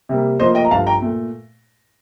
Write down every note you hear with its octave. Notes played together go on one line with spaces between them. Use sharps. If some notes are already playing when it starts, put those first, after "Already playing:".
C3 G3 A#3
A2 F3 A#3 C5 D#5
D#5 G5
A#5
G2 F3 A3 F5 A5
G5 A#5
A#2 A3